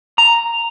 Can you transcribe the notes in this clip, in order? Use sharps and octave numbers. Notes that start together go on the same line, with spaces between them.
A#5